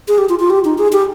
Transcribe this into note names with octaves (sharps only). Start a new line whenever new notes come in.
G#4
G4
F4
F4
G4
D#4
G#4
G4